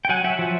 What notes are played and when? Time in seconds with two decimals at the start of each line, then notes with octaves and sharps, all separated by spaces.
0.05 G5
0.09 F#3 F#5 G#5
0.24 F#3 E5 F#5
0.39 F3